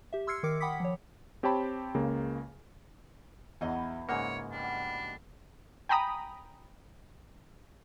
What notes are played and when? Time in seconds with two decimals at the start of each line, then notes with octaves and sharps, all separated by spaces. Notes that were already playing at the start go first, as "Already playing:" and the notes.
0.13 G4 E5
0.27 C6 E6 F6 G#6 C7 C#7
0.43 D#3 A#4 D6 C#7
0.60 F#5 G5 B5 D6 D#6 B6
0.80 F3 C#5
1.43 C4 G4 C#5 G5 A5 B5
1.94 C#2 C#3 A#3
3.61 E2 E3 F#3 E4 D#5
4.09 G#2 C#3 A#3 C#5 F#5
4.52 B2 G3 D4
5.89 G5 G#5 A#5 B5 D#6